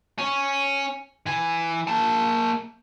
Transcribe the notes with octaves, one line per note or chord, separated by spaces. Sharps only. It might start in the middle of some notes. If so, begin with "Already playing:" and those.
C#4
E3 G#5
A#3 A5